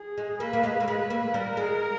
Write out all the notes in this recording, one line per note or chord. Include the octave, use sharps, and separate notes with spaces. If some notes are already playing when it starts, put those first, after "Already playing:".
Already playing: G#4
G#3
A#3 B4
A#3
G#3
A#3
G#3 B4
A#3
G3 A#4
G#3